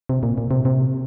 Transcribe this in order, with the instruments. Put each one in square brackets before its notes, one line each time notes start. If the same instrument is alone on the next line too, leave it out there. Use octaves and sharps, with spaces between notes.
[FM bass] C3
A#2
A#2
C3
C3